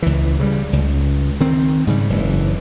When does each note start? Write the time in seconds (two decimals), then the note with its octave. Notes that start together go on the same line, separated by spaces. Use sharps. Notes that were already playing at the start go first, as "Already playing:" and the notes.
0.02 C#2 E3
0.39 C#3 F#3 G3
0.73 C#2
1.40 D#3 C4
1.87 G#2 C#3 G3
2.10 F#1 E3